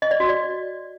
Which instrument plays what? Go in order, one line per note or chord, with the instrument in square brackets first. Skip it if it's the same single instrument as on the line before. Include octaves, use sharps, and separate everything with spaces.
[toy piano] D#5
D5
F#4
D5